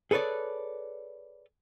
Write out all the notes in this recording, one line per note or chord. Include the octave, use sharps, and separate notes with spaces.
G#4 A4 B4 C#5 D5